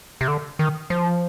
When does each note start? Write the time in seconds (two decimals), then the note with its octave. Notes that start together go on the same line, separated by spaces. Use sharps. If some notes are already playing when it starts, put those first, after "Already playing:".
0.21 C3
0.28 D3
0.59 D#3
0.90 F3